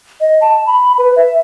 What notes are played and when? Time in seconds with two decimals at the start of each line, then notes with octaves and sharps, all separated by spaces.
0.21 D#5
0.41 A5
0.67 B5
0.98 B4
1.16 E5